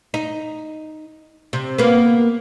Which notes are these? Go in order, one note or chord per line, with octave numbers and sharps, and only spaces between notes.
D#4
C3
A#3 B3